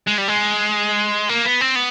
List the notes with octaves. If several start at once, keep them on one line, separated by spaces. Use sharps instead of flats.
G#3
G3
G#3
A#3
B3
C4
B3